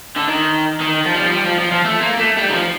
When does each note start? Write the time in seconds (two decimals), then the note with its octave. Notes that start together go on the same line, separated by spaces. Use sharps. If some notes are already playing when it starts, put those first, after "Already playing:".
0.16 D3
0.28 D#3
0.80 D#3
1.05 F3
1.15 G3
1.24 F3
1.32 G3
1.45 F3
1.59 F3
1.72 F3
1.85 A3
2.01 A#3
2.18 A3
2.37 G3
2.49 D#3
2.53 F3